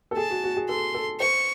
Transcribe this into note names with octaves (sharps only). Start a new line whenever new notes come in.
A4
G#4 A5
F#4
F#4
G#4
A4 C6
A4
C5 C#6